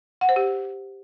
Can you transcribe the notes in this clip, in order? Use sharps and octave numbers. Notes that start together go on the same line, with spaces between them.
F#5
C5
G4